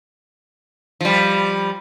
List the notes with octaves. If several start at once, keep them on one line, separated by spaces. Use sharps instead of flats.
F3 G3